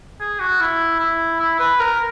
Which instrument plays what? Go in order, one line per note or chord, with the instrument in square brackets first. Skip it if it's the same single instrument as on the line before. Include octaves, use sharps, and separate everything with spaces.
[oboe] G#4
F#4
E4
E4
E4
B4
A#4